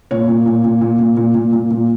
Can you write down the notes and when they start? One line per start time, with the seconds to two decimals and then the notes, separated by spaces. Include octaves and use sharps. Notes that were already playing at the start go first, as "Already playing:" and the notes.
0.11 A#2 C#5
0.28 A#2
0.46 A#2
0.65 A#2
0.81 A#2
0.99 A#2
1.17 A#2
1.34 A#2
1.53 A#2
1.71 A#2